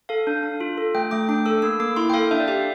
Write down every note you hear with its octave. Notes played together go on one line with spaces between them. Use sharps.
A4 F5
D4
D4
F4
A4
A3 G5
A3 D6
D4 D6
A4 E6
A#3 E6
A#3 D6
E4 C6
G5
A4 F5
D4 E5
D5
G4 E5